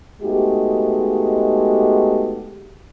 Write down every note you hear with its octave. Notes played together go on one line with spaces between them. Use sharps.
G#3 A3 B3 D#4 F#4 G4